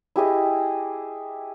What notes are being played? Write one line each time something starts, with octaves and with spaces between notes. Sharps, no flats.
E4 G4 G#4 D#5